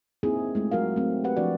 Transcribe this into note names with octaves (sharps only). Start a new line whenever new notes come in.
A#3 C4 D#4 E4 G#4
G#3 A3 F4
F#3 F#4 A#4 F5
A3 C4
G4 B4 F#5
F3 D4 F#4 D5